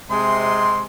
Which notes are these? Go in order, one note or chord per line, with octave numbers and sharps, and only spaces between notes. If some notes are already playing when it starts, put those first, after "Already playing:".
C3 G#3 C6